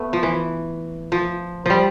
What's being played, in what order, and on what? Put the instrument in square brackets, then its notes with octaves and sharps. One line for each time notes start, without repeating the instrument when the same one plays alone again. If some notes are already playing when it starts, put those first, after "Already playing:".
Already playing: [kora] A3 B3
F3
E3
F3
F3 G3